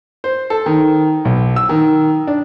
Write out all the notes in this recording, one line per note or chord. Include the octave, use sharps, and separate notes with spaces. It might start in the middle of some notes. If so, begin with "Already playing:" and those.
C5
A4
D#3
B1
E6
D#3
D4